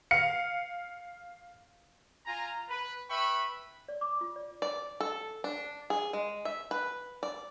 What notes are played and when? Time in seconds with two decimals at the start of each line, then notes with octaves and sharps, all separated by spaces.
0.11 F5 C#7
2.26 F4 G#5 A#5
2.70 B4
3.10 B4 E5 G5 B5 C#6
3.88 D5
4.01 D6
4.21 F4
4.36 D5
4.62 D5
5.00 A4
5.44 D4
5.90 G#4
6.13 G#3
6.45 E5
6.71 B4
7.23 D5